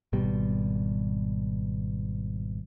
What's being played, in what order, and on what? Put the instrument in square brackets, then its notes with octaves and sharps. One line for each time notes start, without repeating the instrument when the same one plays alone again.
[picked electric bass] G#1 B2 G3